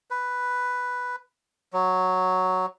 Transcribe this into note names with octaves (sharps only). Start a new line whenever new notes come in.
B4
F#3